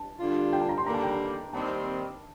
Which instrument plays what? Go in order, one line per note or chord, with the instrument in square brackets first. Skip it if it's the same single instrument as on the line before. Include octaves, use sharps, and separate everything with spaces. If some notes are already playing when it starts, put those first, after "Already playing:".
Already playing: [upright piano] A5
[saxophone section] G2 D3 G3 D4 F4
[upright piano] G5
A5
A#5
C6
[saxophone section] D#2 D3 G3 A#3 [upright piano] A#5
[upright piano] A5
G5
A#5
[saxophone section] D#2 D#3 G3 C4 [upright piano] A5